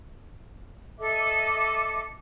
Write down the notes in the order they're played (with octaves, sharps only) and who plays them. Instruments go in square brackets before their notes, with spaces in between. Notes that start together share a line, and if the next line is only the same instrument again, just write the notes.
[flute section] A4 D#5 E5 D6